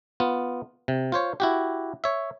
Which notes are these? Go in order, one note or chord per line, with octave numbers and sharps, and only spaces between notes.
B3 F4
C3
F4 C5 C#5
E4 F#4 G4
C#5 E5